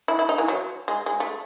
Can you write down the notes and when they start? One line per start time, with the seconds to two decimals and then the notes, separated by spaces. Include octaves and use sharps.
0.08 E4
0.19 E4
0.29 D#4
0.38 E3
0.48 F#3
0.88 G#3
1.06 G#3
1.20 A3